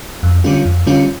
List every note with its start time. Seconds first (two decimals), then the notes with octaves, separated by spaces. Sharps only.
0.23 F2
0.44 D3 G3 C#4 F4
0.65 F2
0.87 D3 G3 C#4 F4